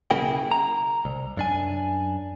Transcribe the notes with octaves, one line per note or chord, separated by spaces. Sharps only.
B1 C#3 A#3 E4 G#4 G5
A#5
C2
F#2 D4 G#5